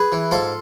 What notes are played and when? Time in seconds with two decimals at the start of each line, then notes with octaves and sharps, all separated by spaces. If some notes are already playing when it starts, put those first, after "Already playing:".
Already playing: G#4 B4
0.12 E3
0.31 G#2 F4 A4